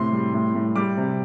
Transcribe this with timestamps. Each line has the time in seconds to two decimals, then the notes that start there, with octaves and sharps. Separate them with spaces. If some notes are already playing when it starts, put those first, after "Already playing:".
Already playing: A2 C3 C6
0.13 G3
0.34 A2
0.55 A2
0.76 G3 D6
0.97 C3